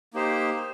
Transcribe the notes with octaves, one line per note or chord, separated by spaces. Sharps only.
A#3 D#4 G4 C5